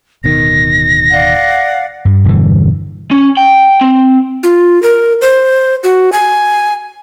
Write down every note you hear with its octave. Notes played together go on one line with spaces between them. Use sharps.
D1 B2 D#3 A#6
D5 F5 F#5
G2 G3
E1 G2 D3 E3
C#4
G5
C4
F4
A#4
C5
F#4
G#5